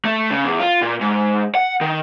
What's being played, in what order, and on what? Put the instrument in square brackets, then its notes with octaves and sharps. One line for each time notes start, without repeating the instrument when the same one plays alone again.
[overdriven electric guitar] A3
C#3
E2
F4
A#2
G#2
F#5
D#3